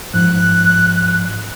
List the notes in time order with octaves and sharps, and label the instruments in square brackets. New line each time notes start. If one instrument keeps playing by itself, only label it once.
[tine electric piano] G#2 F3 [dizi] F#6